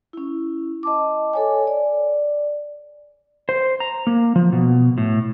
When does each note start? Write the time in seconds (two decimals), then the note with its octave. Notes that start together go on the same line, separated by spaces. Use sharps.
0.13 C#4 E4
0.83 D#5 A5 D6
1.33 A4 C#5 G#5
1.67 D5
3.49 C5
3.80 A#5
4.07 A#3
4.36 F3
4.52 B2
4.98 A2